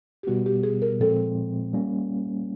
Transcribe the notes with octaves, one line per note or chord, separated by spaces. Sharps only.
G4
B2 G3 B3 F#4
G4
G#4
A#4
A#2 F3 G#3 C4 A4
G3 A#3 C#4